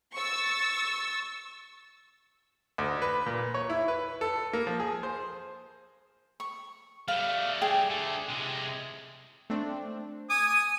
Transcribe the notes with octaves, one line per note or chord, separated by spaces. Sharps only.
C#6 E6 A6
D2
B4
A#2
C#5
E4
B4
A4
A#3
F3
G#4
C5
C#6
G3 A3 F5
G4 G#4 G#5
D3 A3
C3 G#3
A3 C4 D4
G#5 D6 D#6 D#7